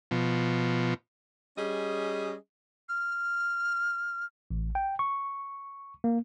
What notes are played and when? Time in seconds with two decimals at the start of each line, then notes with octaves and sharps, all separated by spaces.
0.11 B2 F3
1.57 G3 C#4 G#4 D#5
2.89 F6
4.51 A1
4.75 G5
4.99 C#6
6.04 A#3